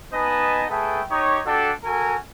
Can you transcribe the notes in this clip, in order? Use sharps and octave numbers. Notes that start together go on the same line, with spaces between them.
B3 D#4 B4 D#5 G#5 A5
A3 G#4 A4 B4 G5
D#4 G4 C#5
D4 F#4 G4 A4
F#4 A4 A#4 G#5